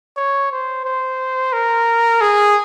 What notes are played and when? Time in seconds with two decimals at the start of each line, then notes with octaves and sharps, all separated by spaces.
0.17 C#5
0.52 C5
0.85 C5
1.53 A#4
2.21 G#4